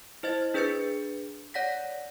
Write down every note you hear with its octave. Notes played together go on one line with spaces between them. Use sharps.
E4 C5 D#5 A6
D4 G#4 B4 G6 A6 C#7
C#5 D5 F#5 A#6 B6